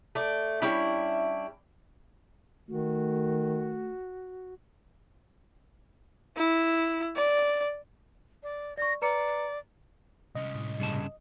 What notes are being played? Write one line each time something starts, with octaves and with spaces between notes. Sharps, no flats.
A3 D5
G3 C#4 D4 E4
D#3 A3 F#4
E4
D5
D5
D5 C#6 A#6
B4 D5 A#5 C#7
C2 C#4 D#5
A2
G2 C#3 A5